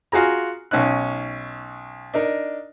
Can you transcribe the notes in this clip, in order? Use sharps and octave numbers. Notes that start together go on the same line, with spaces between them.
F4 F#4 G#4 A#5
B1 C#4 D#4 F#6
D4 D#4 A#4